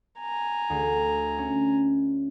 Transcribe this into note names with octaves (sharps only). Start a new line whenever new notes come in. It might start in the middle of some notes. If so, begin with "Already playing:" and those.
G#5 A#5
D2
C#4